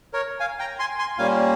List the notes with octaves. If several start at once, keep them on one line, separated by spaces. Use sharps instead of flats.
A#4 C#5
F5 G#5
G5 A#5
G#5 C6
G#5 C6
A#2 G3 A#3 C#4 F5 G#5